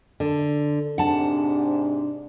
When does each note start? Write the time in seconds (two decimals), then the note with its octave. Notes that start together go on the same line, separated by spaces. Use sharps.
0.20 D3
0.98 G#2 C3 D4 F#5 A5